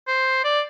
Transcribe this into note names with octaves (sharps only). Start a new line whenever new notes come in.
C5
D5